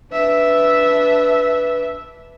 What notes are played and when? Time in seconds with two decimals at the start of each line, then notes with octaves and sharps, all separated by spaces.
0.12 D4 B4 E5